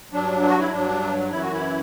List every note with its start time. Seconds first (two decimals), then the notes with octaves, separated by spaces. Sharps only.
0.13 G2 F#3 D4
0.48 F#4
0.60 E4
0.72 G2 F#3 D4
1.31 F#2 E3 E4
1.42 F#4
1.52 E4